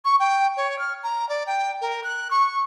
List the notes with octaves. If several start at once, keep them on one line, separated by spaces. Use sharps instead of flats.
C#6
G5
C#5
F6
A#5
D5
G5
A#4
F#6
C#6